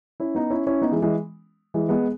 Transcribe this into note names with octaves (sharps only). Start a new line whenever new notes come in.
C#4 E4
B3 D#4
C#4 E4
C#4 E4
B3 D#4
E3 G#3
E3 G#3
E3 G#3
G#3 B3